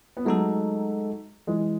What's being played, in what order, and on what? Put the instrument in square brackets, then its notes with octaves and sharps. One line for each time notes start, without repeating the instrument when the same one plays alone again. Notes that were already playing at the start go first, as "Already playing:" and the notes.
[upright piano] B3
[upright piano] F#3 A3 [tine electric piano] G#3 D#4 A4
[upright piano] E3 G#3